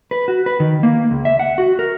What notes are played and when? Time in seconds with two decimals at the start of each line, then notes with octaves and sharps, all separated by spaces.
0.11 B4
0.28 F#4
0.46 B4
0.60 D#3
0.83 A#3
1.11 C#2
1.25 E5
1.39 F#5
1.58 F#4
1.79 A#4